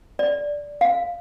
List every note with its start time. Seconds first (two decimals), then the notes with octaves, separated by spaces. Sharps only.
0.19 D5
0.81 F5